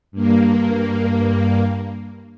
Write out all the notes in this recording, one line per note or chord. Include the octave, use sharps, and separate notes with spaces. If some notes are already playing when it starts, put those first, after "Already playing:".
G2 A#3